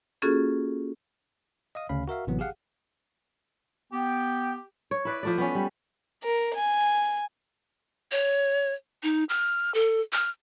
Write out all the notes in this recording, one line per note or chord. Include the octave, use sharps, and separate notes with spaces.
A#3 C#4 F4 F#4 G#4 A4
D#5 F5 D#6
D2 C#3 C#4 F5 B5
F#4 A#4 E5 F5
A1 C3 E3 F#3 B3
G4 G#4 F5 F#5
B3 G4 G5
C#5
E4 B4 D5
F3 A3 D5
B3 C#4
G3
A#4
G#5
C#5
D#4
F6
A4
F6